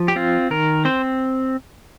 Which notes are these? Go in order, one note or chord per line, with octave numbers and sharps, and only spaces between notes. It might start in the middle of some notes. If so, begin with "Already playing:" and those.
Already playing: F3
G4
C4 F4
D#3 A#4
C4 C5